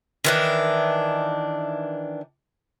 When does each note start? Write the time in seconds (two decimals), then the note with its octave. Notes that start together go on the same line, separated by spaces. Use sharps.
0.24 D#3 E3 D4